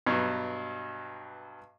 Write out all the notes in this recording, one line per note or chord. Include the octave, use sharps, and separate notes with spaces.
G2 B2 F#3